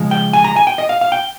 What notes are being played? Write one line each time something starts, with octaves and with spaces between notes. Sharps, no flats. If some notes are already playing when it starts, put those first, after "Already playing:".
Already playing: C#3 F3 G#3
G5
G#5
A#5
G#5
G5
D#5
F5
F5
G5